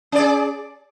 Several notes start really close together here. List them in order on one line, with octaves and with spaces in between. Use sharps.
C#4 D5 G#4